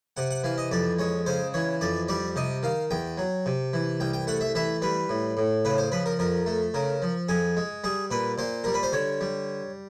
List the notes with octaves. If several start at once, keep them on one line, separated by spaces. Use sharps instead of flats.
C3 F#5
F#5
E3 F5
D#5
F2 D5
G#3 C#5
C#3 C5
E3 C#5
F2 D5
G3 D5
C3 D#5
D#3 F5
E2 G5
F#3
C3
E3
C2 G5
G5
A3 F#5
E5
E3 E5
G3 B4
A2
A2
C#3 B4
C5
F3 B4
A#4
F2 A#4
A3
C#3 A#4
F3
F2 G#4
G#3
G3 G#4
A#2 B4
A#2 C5
G3 A#4
B4
C5
D3 C#5
G3